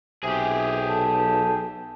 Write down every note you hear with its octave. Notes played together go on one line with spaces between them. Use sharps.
B1 C3 G4 G#4
A4